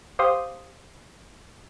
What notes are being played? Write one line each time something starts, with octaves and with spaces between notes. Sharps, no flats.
G4 C5 F5 C6 D#6